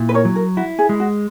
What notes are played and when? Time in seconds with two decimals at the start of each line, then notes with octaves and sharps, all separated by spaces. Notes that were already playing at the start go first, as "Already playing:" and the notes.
Already playing: A#2 E4
0.09 B4
0.14 A#4 C#5
0.25 F#3
0.36 A#4
0.57 E4 F#4
0.79 G#4
0.89 G#3
1.00 F#4